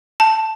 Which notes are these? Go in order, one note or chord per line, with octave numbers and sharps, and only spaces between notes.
A5